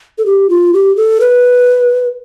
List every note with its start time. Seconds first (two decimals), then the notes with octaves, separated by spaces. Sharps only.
0.18 A4
0.26 G4
0.50 F4
0.74 G4
0.97 A4
1.20 B4